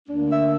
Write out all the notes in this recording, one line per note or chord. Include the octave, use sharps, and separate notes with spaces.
D2 D3 A#3 D4
E5